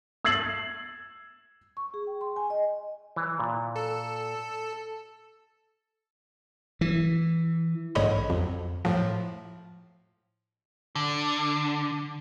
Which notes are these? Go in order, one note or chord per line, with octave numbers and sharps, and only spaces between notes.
E6 G#6 A6 C7 F#7
C#6
G#4
G5
C6
G#5
D#5
E3
A#2
A4
E3
A#1 G#2 D3 C#5 D#5 B5
F2
A2 F3
D3